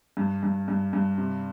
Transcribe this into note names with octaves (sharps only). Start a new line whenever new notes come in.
G2
G2
G2
G2
C3